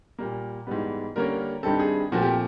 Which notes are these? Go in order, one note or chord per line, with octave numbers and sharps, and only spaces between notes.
A#2 G3 A#3
G#2 E3 G3 B3
D3 G3 A#3 C#4 A#4
G2 D#3 G3 C4 A4
G#4
A#2 F3 A3 C4 F#4
G4